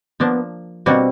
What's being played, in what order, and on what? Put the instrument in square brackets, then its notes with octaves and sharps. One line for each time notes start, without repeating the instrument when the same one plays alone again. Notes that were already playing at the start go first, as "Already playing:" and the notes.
[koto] F3 A#3 D4 [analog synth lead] B3
[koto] B2 G3 A#3 D4 F#4 [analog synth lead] C4